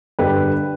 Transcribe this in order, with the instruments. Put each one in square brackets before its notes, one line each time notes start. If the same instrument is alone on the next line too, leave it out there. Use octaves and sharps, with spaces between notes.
[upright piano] G2 D3 G4 B4